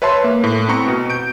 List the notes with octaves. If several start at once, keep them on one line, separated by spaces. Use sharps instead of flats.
B4 C#5 E5 A5 C6
A#3
A2
B3 C4 A#5 C#6 C#7
B2
G6 D7